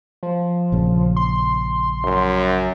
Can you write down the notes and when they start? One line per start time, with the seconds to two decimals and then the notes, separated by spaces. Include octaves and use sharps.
0.23 F3
0.72 A#1 C#3 C#4
1.16 C6
2.04 F#2